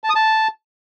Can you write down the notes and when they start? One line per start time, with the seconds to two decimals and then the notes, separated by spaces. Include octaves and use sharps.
0.04 A5
0.10 D#6
0.15 A5